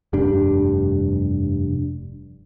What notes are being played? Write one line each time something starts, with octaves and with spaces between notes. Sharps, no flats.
F1 G2 G3 D4